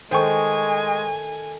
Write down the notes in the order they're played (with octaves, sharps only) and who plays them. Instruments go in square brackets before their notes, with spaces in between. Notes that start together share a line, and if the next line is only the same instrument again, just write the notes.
[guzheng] D#3 A3 [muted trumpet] G#3 [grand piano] C5 G5 C#6 [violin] G#5